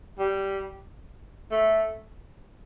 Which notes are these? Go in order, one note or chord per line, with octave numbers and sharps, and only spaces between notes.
G3
A3